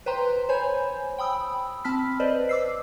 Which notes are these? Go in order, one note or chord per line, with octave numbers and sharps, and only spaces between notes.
B4 C5 G5 A#5 C6
C5 C#5 G#5 B5 G6
G5 B5 D#6 E6
C4 A5 B5 F6 B6
B4 C5 D5 D#5
D6 E6 C7